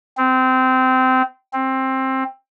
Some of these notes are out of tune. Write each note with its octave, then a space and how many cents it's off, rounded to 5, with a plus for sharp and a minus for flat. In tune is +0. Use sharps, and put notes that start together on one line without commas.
C4 -20
C4 +15